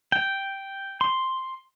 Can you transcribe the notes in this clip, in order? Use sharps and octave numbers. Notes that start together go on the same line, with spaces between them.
G5
C6